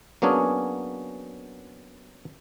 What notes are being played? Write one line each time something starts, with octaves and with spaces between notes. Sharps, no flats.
F#3 A#3 B3 C#4 D4 G#4